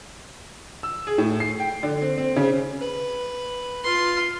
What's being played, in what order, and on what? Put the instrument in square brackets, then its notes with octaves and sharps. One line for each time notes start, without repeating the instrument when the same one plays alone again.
[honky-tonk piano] E6
G#4
A2
C7
G5
D3
C4
C4
C#3
[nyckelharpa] B4
F4 C6